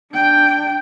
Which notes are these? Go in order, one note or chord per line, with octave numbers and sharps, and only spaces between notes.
D4 G5